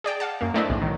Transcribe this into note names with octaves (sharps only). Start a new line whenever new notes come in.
G#4 D5 G5 A5
F5 F#5 A5
F#2 A#3
A3 C4 D4 E4 D5 D#5
B1 E2 A2
D#3 F#3